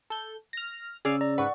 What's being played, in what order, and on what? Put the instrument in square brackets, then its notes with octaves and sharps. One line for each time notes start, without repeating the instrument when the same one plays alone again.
[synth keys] A4 G6
F6 A#6
[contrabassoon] C#3 [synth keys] G#4 D5 F5 [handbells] E6
[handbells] D5 [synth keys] A#5
[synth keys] G#2 B4 [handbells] F#5 C#6